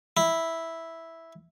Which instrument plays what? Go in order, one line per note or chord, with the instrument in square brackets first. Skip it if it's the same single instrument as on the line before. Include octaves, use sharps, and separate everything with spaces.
[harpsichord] E4